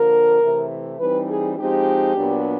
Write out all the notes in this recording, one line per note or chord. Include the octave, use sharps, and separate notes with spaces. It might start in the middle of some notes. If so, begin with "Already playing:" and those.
Already playing: D3 F3 A#3 A#4
C3 E3 A3
E3 G3 C4 D#4 B4
G#4
F3 G#3 C4 D#4 G4
A#2 F#3 B3 D4